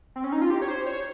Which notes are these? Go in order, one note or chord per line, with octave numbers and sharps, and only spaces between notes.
C4
C#4
D#4
F4
G4
C#5
C5
C#5